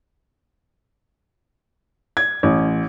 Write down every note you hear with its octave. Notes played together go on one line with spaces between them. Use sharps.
G#6
A1